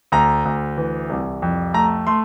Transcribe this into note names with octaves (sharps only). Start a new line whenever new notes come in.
D2 A#5
D2
E3
C2
F2
A3 A#5
A3 C6